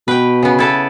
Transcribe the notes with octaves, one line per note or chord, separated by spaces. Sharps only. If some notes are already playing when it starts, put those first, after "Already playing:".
B2 B4 G5
C#3 B3
E4 A4 B4